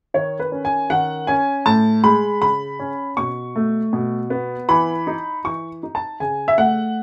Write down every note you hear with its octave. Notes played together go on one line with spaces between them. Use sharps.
D#3 C#5
B4
C#4
G#5
D#3 F#5
C#4 G#5
A2 A5
G#3 B5
C#3 B5
C#4
B2 C#6
A3
B2
B3
E3 B5
D#4
E3 C#6
D#4
A5
C#3 G#5
E5
A3 F#5